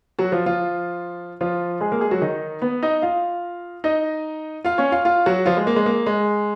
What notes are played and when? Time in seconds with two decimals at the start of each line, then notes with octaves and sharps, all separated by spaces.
0.19 F#3 F#4
0.32 F3 F4
0.46 F3 F4
1.41 F3 F4
1.81 G#3 G#4
1.92 A#3 A#4
2.01 G#3 G#4
2.11 F#3 F#4
2.22 D#3 D#4
2.62 B3 B4
2.83 D#4 D#5
3.02 F4 F5
3.84 D#4 D#5
4.64 F4 F5
4.78 C#4 C#5
4.92 F4 F5
5.05 F4 F5
5.26 F#3 F#4
5.46 F3 F4
5.57 G#3
5.67 A#3
5.76 G#3
5.86 A#3
6.06 G#3